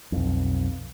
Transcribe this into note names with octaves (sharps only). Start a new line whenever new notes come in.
B1 F2